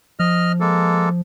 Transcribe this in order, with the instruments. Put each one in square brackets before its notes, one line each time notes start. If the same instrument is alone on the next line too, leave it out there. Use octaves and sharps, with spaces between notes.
[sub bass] F3 [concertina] D#5 F6
[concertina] G#3 A#3 A4